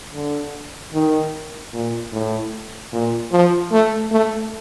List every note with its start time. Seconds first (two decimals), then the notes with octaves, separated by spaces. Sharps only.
0.14 D3
0.93 D#3
1.73 A#2
2.12 A2
2.92 A#2
3.31 F3
3.72 A3
4.11 A3